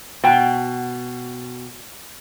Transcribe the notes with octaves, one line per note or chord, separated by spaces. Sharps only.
B2 G5